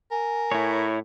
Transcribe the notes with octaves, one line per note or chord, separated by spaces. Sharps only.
A#4 G#5
A2 E4 C#5